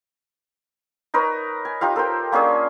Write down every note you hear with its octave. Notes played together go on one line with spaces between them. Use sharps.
D#4 A#4 B4 C#5
G#5
D#4 F4 G4 F5
A4 A#4 C5 G5
A#3 C#4 D4 G#4